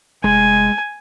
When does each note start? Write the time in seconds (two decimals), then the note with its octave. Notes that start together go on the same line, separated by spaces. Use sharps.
0.24 F1 G#3 G#5